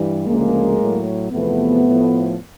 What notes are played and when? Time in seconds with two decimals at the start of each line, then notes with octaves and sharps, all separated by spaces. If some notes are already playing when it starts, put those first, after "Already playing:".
Already playing: G2 E3 G3
0.26 D2 C#3 F3 G#3 A#3
0.79 A2 F#3
1.31 E2 C3 F3 A3 B3
1.84 A2 F3